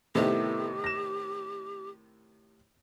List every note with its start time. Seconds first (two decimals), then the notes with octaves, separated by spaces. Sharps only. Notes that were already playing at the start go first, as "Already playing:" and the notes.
0.15 A2 C3 D#3 A3 B3 E4 G4
0.84 A#6 E7